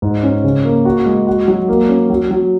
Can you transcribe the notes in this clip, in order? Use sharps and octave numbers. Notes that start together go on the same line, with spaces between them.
G#2
C#4
C#3
A#3
F#4
G#3
F#4
F#3
A#3
C#4
F#3
F#3